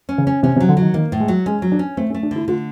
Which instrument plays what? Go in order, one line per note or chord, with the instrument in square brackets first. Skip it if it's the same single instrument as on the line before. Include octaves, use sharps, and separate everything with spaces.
[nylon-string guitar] C#4
[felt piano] C#3
[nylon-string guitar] C#4
[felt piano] C3 [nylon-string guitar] C#4
[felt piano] C3
[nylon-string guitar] F#3
[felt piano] D3
[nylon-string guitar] F#3
[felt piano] D#3
[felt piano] D#3 [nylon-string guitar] A#3
[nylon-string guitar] A2
[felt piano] G#3
[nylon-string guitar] F#3
[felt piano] G#3 [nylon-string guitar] C#4
[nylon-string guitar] F#3
[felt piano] D4
[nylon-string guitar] C#4
[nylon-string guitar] A3 [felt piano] C4
[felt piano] C#4
[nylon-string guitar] A3
[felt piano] D4
[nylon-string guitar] D3 [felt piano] E4
[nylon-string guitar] D3 [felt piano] F4